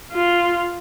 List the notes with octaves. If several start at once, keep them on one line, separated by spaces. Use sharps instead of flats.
F4